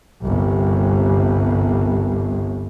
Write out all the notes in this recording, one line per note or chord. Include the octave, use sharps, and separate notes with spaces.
G1 C2